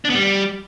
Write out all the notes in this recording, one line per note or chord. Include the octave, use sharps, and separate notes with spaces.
D4
B3
G3